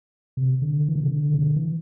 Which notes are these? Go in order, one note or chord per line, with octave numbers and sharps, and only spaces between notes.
C3
D3
E3
D3
C3
D3
C3
D3
E3